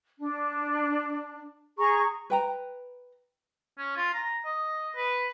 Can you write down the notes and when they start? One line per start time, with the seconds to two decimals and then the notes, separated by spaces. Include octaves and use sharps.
0.18 D4
1.78 G#4 A#5 C#6
2.30 B4 G5 A#5
3.78 C#4
3.97 F4
4.13 A#5
4.45 D#5
4.96 B4